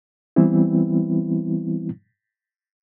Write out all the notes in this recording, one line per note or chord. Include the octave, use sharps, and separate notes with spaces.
E3 G3 B3 C4 E4